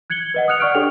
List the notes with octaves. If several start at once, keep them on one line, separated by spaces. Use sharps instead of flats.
F#6 G#6 C#7 F#7 G7
B4 D#5 F#5
D#6 F6 F#6 C#7 F7
D5 F#5 C#6 F6 F#6 D7
D4 G4 A4 C#5 G5 F7